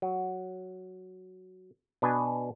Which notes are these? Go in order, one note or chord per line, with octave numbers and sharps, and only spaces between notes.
F#3
B2 D4 B4 D#5 G#5